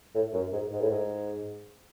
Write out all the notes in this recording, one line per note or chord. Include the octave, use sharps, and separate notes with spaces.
A2
F#2
G#2
G#2
A2
G#2